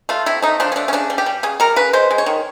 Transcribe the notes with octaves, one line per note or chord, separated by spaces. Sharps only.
A3 F4
C3 E4
A3 D#4
F3 D4
C#4
A3 D4
C#4
C#3 D4
G3
G4
G3
C#3 G#4
G3 A#4
C#3 B4
G#3 C5
G#3
C#5
D#3